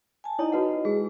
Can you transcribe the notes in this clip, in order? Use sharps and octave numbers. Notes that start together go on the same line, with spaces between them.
G#5 A5
D#4 E4 C#5 D#5
F#4 B4 F#5
G#3 G#4